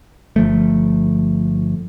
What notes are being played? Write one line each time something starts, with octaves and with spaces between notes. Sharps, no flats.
G1 F3 A3